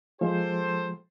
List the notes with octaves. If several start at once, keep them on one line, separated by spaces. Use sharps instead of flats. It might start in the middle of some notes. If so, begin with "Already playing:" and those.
F3 G#3 G4 A4 C5